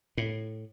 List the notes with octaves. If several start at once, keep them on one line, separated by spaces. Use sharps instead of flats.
A2